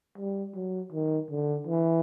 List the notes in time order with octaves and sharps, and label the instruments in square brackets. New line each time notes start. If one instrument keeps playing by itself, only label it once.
[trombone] G3
F#3
D#3
D3
E3